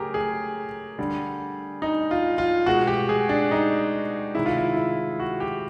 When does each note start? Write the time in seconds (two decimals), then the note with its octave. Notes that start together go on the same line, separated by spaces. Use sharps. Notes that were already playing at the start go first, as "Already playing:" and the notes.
Already playing: C#3 F#3 A3 G4 G#4 A#4
0.14 G#4
0.99 D3 G3
1.82 D#4
2.11 F4
2.38 F4
2.66 B2 G#3 F#4
2.87 G4
3.09 G#4
3.29 D4
3.51 D#4
4.35 C3 D#3 G#3 E4
4.46 F4
4.58 E4
4.77 E4
5.20 F#4
5.40 G4